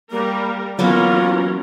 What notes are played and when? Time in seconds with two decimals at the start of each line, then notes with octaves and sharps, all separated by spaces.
0.11 G3 A#3 A#4
0.79 E3 F#3 A#3 B3 C#4 F4 F#4 A#4